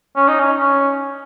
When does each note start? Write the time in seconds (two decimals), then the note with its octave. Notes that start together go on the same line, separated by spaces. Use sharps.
0.16 C#4
0.28 D#4
0.39 C#4
0.59 C#4